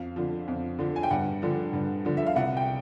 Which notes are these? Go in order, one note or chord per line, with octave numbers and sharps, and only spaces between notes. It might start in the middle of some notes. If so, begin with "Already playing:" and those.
Already playing: F2 F5
D3 F3
F2
D3 F3
G#5
G5
G2 F#5
D3 F3
G2
D3 F3
E5
F5
C2 F#5
G5